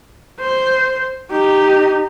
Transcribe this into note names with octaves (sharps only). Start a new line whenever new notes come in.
C5
D#4 G4